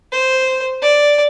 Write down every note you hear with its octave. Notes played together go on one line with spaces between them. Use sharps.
C5
D5